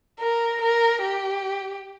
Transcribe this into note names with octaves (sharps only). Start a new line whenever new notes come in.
A#4
A#4
G4